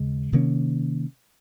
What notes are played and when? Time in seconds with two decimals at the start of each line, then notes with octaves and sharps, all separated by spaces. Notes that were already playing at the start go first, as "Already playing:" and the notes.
Already playing: D#2 C#3 G#3
0.32 C3 D#3 A#3 C#4